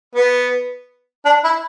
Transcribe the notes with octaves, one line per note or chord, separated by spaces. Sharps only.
B3
D4
E4